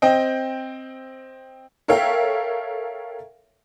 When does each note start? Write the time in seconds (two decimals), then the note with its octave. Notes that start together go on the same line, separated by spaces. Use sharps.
0.02 C4 D#5 G5
1.88 A4 A#4 C#5 E5 F5 G5